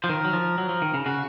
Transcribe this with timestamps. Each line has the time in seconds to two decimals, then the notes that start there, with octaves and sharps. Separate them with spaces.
0.03 F3 C5
0.09 D#3 A#4
0.25 F#3
0.33 F3
0.58 F#3
0.69 F3
0.82 D#3
0.94 C#3
1.06 C#3 F#4